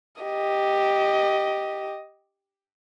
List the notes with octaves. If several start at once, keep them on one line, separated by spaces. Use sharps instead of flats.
G4 D#5